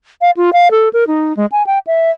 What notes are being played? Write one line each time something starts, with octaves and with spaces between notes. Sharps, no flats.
F5
F4
F5
A4
A#4
D#4
G#3
G#5
G5
E5